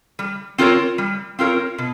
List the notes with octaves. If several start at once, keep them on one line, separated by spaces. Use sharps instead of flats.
G3
C4 F4 A#4 C#5
G3
C4 F4 A#4 C#5
B2